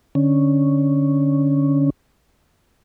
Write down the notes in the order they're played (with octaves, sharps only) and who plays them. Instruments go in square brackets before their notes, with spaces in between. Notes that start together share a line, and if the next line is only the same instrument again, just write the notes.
[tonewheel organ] D3 C#4